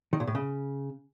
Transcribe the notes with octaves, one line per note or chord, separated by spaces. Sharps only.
D#3
A#2
A2
C#3